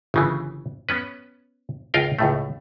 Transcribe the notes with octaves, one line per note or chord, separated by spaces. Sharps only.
G1 C#3 E3
B3 C#4 B4
C#2 F4 A#4 F5 G5
C#2 A2 A3